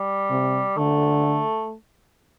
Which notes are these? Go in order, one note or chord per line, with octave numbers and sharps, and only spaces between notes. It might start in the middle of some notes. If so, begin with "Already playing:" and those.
Already playing: G3
C3
D3 A3